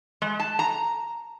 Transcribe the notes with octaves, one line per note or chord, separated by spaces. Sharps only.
G#3
A5
A#5